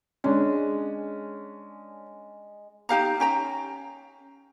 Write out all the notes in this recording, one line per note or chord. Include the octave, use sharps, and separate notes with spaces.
G#3 C#4 D4
D#4 G4 F5 A#5
C#4 G5 A#5